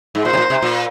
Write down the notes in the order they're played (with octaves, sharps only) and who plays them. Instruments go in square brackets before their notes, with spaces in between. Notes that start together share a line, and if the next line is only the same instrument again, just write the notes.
[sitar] G#2
[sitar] A#2 [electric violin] C5
[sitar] C3
A#2
C3
A#2